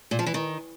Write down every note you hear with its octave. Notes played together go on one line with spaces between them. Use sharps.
A#2
F3
E3
D#3